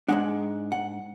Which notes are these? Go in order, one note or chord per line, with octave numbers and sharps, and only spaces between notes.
G#2 G#3 D4 F#5
F#5